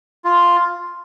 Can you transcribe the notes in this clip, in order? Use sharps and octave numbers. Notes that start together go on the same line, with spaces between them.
F4